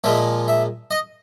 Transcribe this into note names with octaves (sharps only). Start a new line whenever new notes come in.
A#2 F3 G#3 E5
E5
D#5